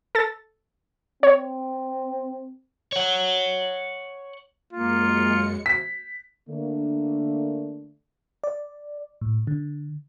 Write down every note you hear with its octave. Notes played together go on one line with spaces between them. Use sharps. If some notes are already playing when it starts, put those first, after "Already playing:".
A4 A6
C4 C#5
C#5 F#5
F#2 G#3 A#3 F4 C#7
B6
D3 A3 A#3 D4
D5
A2
D3